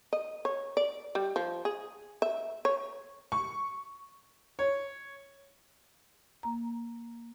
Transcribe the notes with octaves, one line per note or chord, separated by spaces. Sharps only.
D#5
C#5
D5
G3
F3
G#4
E5
C#5
C#6
C#5
A#3 A#5